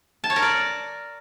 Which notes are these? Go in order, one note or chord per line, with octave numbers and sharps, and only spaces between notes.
A5
C#5
A#4
D5